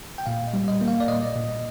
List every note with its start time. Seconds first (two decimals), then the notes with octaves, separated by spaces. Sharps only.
0.18 G5
0.26 A#2 F5
0.47 D#5
0.54 G3
0.68 D#5
0.81 A#3
0.88 F5
1.00 D5
1.08 A#2 D#5
1.36 A#2